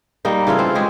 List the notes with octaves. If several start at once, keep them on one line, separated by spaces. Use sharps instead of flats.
G3 A#3 D#4
C#3 E3 F4 A4
C4
G#3 C#4 G4 G#4